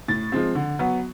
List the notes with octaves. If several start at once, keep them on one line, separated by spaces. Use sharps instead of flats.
A2 A6
F3 G#3 C4
D3
F#3 B3